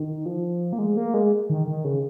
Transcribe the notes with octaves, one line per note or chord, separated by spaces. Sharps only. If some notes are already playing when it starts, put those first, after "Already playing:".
Already playing: D#3
F3
A#3
G#3
A#3
G#3
D#3
D#3
C#3